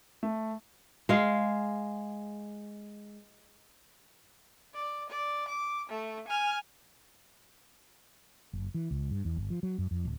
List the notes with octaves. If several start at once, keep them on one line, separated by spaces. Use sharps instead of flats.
A3
G#3 F5
D5
D5
D6
A3
G#5 F6
F#1
E3
C#2
G2
E2
G1
F3
F#3
F#2
F2
D1